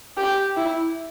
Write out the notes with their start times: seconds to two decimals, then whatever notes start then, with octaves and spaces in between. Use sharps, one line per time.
0.17 G4
0.57 E4